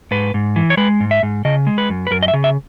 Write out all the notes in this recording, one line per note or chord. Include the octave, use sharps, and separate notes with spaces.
G#2 B4
G#2
E3
C#5
G#3 B4
G#2
E5
G#2
C#3 D#5
G#3
B4
F#2
B4
F#2 A#4
D#5
E5
C#3
E5